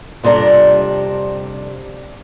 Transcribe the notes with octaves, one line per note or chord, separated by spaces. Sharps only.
F2 C3 G3 D4 A#5